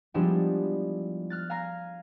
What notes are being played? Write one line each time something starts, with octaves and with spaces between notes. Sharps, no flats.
F3 G3 G#3 B3 D4 E4
F6 F#6 A6
F5 G#5 A#5 F6 A#6